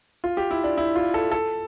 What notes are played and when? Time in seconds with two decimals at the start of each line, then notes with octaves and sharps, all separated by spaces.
0.24 F4
0.37 G4
0.51 E4
0.64 D4
0.78 E4
0.96 F4
1.14 A4
1.31 A4